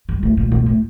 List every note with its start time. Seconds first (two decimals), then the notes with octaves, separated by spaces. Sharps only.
0.09 G2
0.23 A2
0.37 A#2
0.52 A#2
0.66 A2